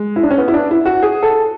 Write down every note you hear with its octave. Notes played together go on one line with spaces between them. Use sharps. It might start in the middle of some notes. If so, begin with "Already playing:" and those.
Already playing: G#3
E4
D4
C#4
B3
E4
D4
E4
F#4
G#4
A4